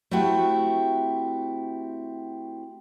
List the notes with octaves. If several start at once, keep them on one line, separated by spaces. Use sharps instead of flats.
A3 C4 E4 F#4 G4